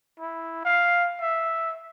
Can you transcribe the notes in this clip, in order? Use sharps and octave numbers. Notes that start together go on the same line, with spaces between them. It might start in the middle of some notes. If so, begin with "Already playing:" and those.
E4
F5
E5